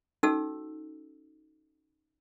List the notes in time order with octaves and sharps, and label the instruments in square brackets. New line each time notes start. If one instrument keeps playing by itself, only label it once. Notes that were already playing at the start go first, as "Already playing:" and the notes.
[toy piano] C#4 D#4 F#4 A4 E6